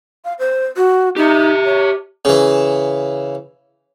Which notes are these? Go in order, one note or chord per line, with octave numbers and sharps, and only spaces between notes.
F5
C5
F#4
D#4 G4 E5
C#5
C#3 E3